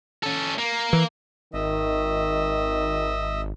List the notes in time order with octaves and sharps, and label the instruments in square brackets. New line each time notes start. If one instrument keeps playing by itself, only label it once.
[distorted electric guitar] C#4 A4
A#3
[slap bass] E3
[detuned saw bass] G#1 [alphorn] D#3 [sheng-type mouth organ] D#5 E5